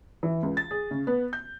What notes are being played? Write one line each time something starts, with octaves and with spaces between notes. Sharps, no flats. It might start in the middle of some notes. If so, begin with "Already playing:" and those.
E3
C#2
A6
G#4
C#3
B3
G6